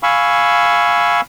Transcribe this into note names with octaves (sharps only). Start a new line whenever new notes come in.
F5 G#5 B5 C#6 E6